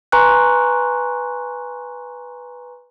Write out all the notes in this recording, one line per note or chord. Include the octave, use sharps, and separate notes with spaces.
B4 G#5 A#5 C6 C#6 F#6